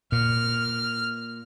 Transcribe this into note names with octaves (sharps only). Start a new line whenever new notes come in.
A#2 F6